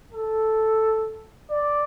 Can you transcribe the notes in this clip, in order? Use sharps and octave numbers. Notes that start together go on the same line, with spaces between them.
A4
D5